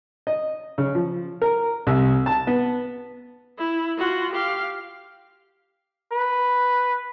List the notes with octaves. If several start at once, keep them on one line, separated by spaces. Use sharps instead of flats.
D#5
C#3
F3
A#4
C2
A5
B3
E4
F4 F#4
G4 F5
B4